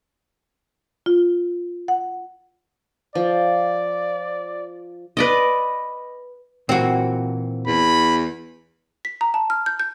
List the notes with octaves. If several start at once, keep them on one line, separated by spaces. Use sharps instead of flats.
F4
F#5
F3 D5
B4 D5 D#5
A#2 E3 A#3 C4 F#4
E2 B5
B6
A#5
A5
F6
G6
G6